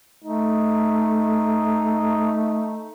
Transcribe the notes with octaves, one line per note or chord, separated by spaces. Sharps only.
A3 D#4